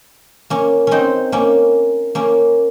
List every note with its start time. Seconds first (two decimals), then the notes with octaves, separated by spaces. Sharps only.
0.50 A#3 C#4
0.87 C4 C#4 D#4
1.32 A#3 C#4
2.15 A#3 C#4